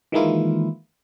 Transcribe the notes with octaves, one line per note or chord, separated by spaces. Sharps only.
D#3 E3 G#3 A#3 E4 F4